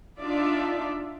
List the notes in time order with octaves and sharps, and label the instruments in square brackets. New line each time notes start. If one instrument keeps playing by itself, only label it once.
[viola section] D4 D#4 F4 D5 E5